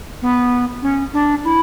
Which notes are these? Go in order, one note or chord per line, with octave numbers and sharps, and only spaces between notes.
B3
C#4
D4
E4